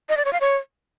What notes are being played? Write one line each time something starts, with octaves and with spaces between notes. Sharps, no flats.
D#5
D5
C#5
F5
C#5